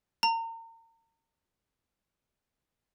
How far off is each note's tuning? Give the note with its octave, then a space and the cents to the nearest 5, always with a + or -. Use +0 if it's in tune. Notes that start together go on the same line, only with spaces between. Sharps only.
A#5 -40